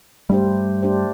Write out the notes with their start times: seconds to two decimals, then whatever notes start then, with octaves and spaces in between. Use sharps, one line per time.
0.29 G2 G3 A3 D4 G4 C5
0.82 A3 D4 G4 C5